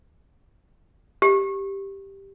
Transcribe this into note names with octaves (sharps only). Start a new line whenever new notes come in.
G4